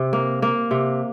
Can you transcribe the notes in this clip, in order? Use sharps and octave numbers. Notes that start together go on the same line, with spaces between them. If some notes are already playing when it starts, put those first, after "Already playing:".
Already playing: C3
A#3
A#3
C3